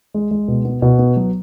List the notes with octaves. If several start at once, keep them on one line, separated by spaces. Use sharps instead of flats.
G#3
G#3
B2
B3
B2
B3
F#3